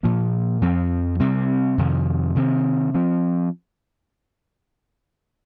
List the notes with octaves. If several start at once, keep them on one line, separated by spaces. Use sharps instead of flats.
A#2 F3 A#3
F2 F3 C4
C3 G3 C4
F2 C3 D#3
C3 D#3 C4
F3 C4